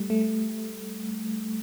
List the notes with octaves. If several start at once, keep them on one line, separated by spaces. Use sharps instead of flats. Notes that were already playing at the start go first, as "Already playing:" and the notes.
Already playing: G3 A3
A3